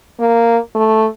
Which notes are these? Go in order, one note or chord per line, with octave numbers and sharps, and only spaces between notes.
A#3
A3